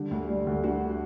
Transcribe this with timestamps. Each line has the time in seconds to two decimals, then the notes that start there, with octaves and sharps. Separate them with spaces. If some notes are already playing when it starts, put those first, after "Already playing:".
Already playing: D3 G3
0.11 D2
0.29 G3
0.47 D2
0.64 D3 F#4